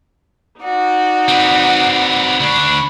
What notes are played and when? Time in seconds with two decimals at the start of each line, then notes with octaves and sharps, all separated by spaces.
0.61 D#4 F#4 D5
1.29 C4 B4
2.40 D2 D4 B5 C#6